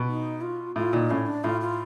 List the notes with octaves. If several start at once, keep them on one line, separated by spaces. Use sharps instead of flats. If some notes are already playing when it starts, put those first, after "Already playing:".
Already playing: B2
D#4
F4
A2 F4
A#2 D#4
A2 C#4
D4
A2 F4
F4